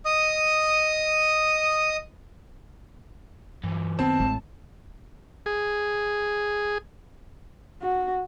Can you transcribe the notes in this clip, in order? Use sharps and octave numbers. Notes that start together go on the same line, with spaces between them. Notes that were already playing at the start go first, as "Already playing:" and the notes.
D#5 D#6
G2 E3 F#3
F#2 D#3 B3 C4 A5
A1 A2 G#3
G#4
F#4